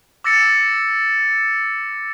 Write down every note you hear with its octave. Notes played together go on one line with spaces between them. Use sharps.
D6 E6 A6 A#6 C#7